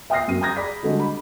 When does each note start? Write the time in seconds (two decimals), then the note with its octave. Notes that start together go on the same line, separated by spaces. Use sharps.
0.10 E5 G5 D#6 F6 A#6 C7
0.28 F#2 D#7
0.41 G5 A#5 D#6 G6 G#6 A#6
0.56 G#4 D5 B5 D6 B6
0.83 D3 G3 G#3 F#4 A4 D#5
1.00 B5